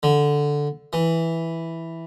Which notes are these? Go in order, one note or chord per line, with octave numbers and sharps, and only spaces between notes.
D3
E3